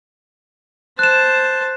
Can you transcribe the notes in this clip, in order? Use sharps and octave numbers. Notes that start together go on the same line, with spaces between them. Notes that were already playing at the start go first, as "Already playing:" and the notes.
C5 A5 F#6 E7